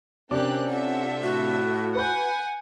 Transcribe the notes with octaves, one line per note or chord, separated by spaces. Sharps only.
C3 A#3 C#4 D4 G4 D6 F#6
F4 A4 E5 F#5
A2 F#4
B4 F#5 G#5 B5 G6